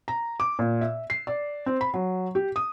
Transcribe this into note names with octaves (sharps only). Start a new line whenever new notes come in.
A#5
D6
A#2
E5
C7
D5
C4
B5
F#3
G4
D#6